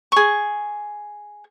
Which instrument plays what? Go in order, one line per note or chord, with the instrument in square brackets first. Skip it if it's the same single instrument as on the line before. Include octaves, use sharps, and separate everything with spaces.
[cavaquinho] G#4 C#6